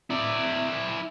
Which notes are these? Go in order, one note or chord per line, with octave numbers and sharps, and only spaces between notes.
E4 D5